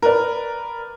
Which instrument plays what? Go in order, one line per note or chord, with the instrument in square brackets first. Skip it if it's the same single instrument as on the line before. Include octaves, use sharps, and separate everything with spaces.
[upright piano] A#4 B4 D5